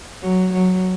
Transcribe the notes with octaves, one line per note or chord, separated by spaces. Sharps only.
F#3
F#3